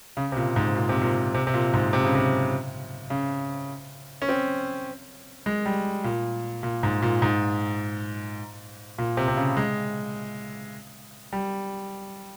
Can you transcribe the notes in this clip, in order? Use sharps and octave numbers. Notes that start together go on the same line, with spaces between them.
C#3
C3
A#2
G#2
A#2
C3
A#2
C3
C3
A#2
G#2
C3
C#3
C3
C#3
C#4
C4
G#3
G3
A#2
A#2
G#2
A#2
G#2
A#2
C3
C3
C#3
G#3
G3